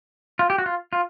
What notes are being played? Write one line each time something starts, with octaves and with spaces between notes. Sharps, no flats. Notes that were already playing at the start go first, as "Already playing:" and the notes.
F4
G4
F#4
F4
F4